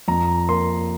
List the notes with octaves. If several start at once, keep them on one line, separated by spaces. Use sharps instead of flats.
F2 A#5
A#3 C6